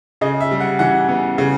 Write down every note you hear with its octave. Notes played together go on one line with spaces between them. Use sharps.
C#3 D#5
E5
G3
F#5
E3 F#5
B3
C#3